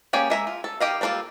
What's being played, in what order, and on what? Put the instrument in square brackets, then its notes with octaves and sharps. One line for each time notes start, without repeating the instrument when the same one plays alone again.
[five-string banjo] A#3 C#4 G4 G#4 D5
G#3 E5 A#5
F4
A4
D#3 G4 D#5 F5
G3 A#3 D4 F4 A4